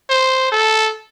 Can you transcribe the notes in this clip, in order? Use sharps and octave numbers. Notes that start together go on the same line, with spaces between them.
C5
A4